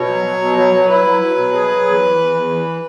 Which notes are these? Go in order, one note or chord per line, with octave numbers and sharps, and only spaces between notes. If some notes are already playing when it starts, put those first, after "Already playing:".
Already playing: B2 C#5
F#3
F#3
B2
F#3
F#3
E4 B4
F#3
F#3
B2
G#4
F#3
E2
E3
E2
E2
E3